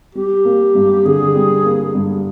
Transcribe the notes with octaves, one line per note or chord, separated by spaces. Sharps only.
G3 G4
A#3
G2
D3 G#4
G3
A#3
G2